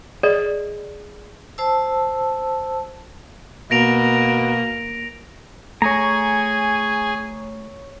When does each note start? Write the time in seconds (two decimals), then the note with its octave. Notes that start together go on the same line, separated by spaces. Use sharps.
0.23 G#4 D5 D#5
1.58 C5 A5 E6
3.71 B2 A#3 A#6 D7 F7
5.82 A3 G#4 C#5 G#5 A#5